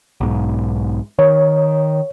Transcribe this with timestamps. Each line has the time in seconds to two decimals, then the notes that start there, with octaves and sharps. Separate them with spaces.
0.20 B1 G#2
1.19 D#3 C#5